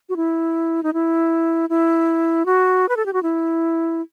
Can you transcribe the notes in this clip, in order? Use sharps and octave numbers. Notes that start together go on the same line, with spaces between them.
F#4
E4
D#4
E4
E4
F#4
B4
A4
G4
F#4
E4